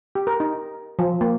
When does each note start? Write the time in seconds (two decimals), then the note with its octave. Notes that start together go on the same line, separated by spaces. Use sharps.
0.15 G4
0.27 A#4
0.40 D#4
0.99 F3
1.21 A#3